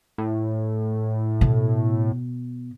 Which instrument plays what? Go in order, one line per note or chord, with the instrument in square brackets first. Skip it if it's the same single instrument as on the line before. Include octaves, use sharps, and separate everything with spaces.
[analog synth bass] A2
[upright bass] B2